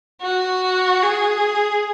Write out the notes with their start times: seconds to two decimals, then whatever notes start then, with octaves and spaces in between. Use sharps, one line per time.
0.21 F#4
1.03 G#4